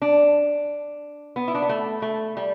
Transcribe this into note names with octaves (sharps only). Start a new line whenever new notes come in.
D4
B3
E4
D4
B3
A3
A3
G3